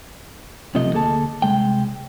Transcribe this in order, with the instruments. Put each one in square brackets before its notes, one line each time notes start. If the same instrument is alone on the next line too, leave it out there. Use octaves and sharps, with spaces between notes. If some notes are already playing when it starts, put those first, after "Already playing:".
[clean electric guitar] B1 C3 F3 A3 D#5
D2 A#3 G#4 A4 A5
C2 E3 G#3 G5